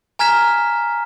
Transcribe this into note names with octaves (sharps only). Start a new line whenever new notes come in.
G#5 A#5 F6 G#6 B6 E7